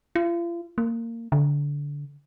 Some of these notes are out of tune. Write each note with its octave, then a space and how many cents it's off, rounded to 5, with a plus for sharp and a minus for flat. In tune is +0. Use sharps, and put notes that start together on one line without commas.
F4 -40
A#3 -20
D3 -20